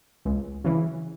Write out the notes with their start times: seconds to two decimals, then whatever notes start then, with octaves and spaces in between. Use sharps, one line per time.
0.25 C#2
0.64 C#3 E3